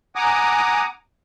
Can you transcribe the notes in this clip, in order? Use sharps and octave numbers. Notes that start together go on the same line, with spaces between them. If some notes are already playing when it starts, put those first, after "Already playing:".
F#5 G#5 A#5 D6 D#6